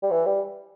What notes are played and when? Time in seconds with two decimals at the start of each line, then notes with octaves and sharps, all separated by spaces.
0.03 G3
0.11 E3
0.26 G3